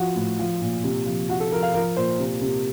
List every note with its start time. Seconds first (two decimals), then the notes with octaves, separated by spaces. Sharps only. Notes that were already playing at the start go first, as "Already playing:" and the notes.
Already playing: F3 F#4
0.16 A2
0.39 F3
0.62 A#2
0.84 C3
1.06 F3
1.29 F3 F#4
1.40 A4
1.52 F3 A#4
1.63 F5
1.74 F3 A#4
1.97 A#2 C5
2.19 C3
2.41 C3